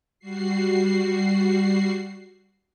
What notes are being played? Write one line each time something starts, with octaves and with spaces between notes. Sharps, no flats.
G3 F#4 C7